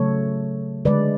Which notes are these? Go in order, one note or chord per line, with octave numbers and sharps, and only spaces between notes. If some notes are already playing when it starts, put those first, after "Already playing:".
Already playing: C#3 F#3 A3 A4 C#5
D3 G#3 B4 D5